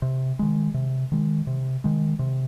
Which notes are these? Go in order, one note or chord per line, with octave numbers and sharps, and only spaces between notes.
C3
D#3 G#3
C3
D#3 G#3
C3
D#3 G#3
C3